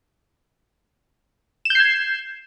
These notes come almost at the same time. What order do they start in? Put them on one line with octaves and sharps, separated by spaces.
E7 G6 C7 G#6